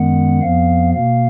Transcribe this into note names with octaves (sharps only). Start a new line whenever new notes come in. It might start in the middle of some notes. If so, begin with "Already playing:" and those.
Already playing: F#2 D#3 G#3 B3 F#5
F2 F3 B3 F5
B2 A#3 F5